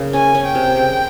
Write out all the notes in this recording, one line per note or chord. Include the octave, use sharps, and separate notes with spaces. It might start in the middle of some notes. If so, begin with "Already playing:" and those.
Already playing: C#3 A#3
C#4 G#5
C#4
G5
C3
C#3